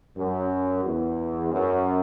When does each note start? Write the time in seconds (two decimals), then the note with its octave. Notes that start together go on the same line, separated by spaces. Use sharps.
0.17 F#2
0.84 E2
1.52 F#2